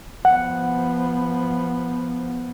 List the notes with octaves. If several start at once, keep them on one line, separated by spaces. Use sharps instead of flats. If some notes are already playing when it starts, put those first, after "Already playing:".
F3 B3 F#5